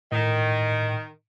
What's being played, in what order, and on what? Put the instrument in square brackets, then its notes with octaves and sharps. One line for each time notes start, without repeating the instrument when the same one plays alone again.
[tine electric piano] A2 [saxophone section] D#3